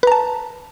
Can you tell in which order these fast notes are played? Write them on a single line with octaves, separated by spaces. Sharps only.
B4 A#5 A5